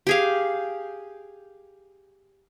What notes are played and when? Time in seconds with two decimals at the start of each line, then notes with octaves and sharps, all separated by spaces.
0.07 G4 G#4 F5